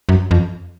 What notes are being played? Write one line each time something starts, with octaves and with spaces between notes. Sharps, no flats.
F#2
F2